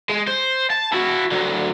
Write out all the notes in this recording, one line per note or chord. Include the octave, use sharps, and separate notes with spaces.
G#3
C5
A5
E4 F#4
D3 F#3